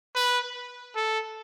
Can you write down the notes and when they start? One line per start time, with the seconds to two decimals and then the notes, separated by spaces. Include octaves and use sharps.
0.15 B4
0.95 A4